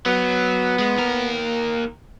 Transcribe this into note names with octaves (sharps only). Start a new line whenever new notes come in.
F#3 B3
G#3
D#2 A#4